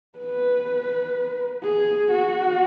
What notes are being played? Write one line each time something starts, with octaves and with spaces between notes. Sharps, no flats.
B4
G#4
F#4